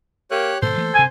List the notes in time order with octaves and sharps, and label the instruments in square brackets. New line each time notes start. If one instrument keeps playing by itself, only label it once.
[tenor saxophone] A#3 [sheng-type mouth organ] G4 C#5 F#6
[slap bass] G#2 B2 D#3 [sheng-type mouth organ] A4 [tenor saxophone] C5
[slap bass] E3 A3 A#3
[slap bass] G2 C3 [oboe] G#5